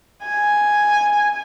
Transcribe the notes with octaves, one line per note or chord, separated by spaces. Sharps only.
G#5